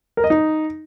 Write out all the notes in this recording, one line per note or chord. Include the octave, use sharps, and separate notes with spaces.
A#4
D#5
D#4